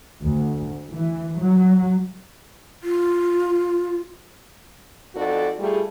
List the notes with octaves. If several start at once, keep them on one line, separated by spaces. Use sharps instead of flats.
D2
E3
F#3
F4
F2 D#4 F#4 A4 D5
G3 A3 F4 G4 G#4